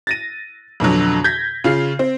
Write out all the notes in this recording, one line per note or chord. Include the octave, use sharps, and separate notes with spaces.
A6 A#6 D#7
F2 B2 D3 F#3
G6 G#6 A#6 B6
C#3 F4 C7
C4